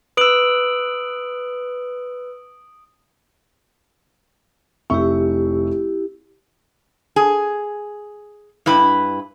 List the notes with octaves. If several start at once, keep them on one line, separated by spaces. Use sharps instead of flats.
B4 D#6 E6 D7 F#7
F1 E4 G4 E5 C#6
G#4
G2 E4 B4